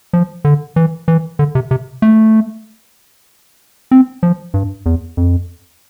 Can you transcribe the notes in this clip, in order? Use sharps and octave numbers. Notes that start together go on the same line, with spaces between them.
F3
D3
E3
E3
D3
C3
C3
A3
C4
F3
G2
E2
F2